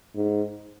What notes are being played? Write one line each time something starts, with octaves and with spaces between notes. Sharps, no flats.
G#2